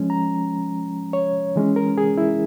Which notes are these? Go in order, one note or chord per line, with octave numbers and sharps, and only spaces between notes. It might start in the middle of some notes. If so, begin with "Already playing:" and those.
Already playing: F3 G#3 C#4
A#5
C#5
E3 G#3 C#4
A#4
G#4
E4